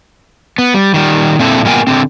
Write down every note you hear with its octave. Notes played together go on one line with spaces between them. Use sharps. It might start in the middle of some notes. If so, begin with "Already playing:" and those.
B3
G3
D#3 G3
A#2 D3 C4 E4 A4
A#2 G#3 B3 A#4 G5 G#5
D3 C4